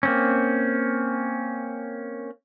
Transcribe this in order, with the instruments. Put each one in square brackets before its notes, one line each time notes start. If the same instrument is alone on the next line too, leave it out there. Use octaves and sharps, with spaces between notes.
[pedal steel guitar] A#3 C4 C#4